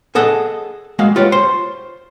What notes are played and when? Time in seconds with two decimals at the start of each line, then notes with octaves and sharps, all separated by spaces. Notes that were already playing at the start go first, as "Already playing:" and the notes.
0.15 G#4 A4 D#5 F#5
0.99 G#3 A#3 F#4 F5
1.16 F4 G4 B4 C#5 D5
1.32 C5 C#5